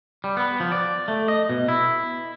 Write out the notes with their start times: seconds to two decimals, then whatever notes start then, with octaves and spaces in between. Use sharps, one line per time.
0.24 G3
0.37 B3
0.60 F3
0.72 D5
1.08 A3
1.28 D#5
1.50 B2
1.68 E4